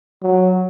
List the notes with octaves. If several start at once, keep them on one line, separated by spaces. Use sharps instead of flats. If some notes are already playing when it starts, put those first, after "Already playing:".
F#3